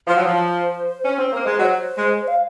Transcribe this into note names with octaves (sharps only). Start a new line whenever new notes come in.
F3 C5
F#3
F3
C#4
C4
A#3
G#3
F#3 C5 D#5
G#3
F5